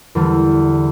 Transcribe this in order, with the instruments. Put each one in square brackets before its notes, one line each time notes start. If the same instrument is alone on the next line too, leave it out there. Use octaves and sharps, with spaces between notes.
[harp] E2 D3 G3